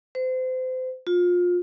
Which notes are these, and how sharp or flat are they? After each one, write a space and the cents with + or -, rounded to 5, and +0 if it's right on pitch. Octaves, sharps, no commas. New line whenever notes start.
C5 -30
F4 +25